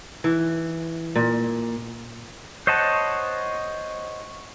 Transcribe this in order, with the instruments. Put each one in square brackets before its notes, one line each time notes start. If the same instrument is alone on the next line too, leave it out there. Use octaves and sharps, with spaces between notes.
[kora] E3
A#2
[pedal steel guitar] C5 C#5 D#5 F#5 A5